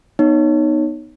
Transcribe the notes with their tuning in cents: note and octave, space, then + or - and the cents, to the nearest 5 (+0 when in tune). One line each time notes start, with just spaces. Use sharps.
B3 -5 D#4 -15 C#5 +0